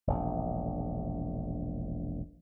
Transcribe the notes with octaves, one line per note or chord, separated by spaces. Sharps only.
E1 A#1